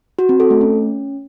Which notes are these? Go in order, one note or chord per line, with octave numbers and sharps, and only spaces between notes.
F#4
C4
A4
A3
C#4